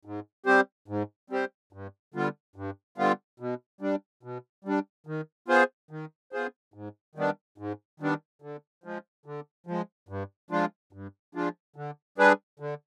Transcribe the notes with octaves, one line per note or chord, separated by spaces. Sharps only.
G#2
G3 C4 G4 C5
G#2
G3 C4 G4 C5
G2
D3 G3 B3 F4
G2
D3 G3 B3 F4
B2
G3 D4
B2
G3 D4
D#3
B3 F4 G#4 C5
D#3
B3 F4 G#4 C5
G#2
D#3 G3 B3 D4
G#2
D#3 G3 B3 D4
D3
F3 G#3
D3
F3 G#3
G2
F3 G#3 D4 F4
G2
F3 G#3 D4 F4
D3
G3 D4 G#4 B4
D3